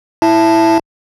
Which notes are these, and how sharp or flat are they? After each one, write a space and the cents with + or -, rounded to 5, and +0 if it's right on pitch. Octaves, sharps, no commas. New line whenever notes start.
E4 +0 E5 +15 A5 +0